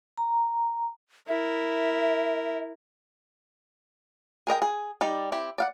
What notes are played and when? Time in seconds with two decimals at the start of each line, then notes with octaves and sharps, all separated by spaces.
0.18 A#5
1.28 E4 A#4 E5
4.47 G#4 A#4 D#5 G5
4.62 G#4
5.01 G3 D#4 D5
5.32 C4 E4 G4
5.58 D5 F5 F#5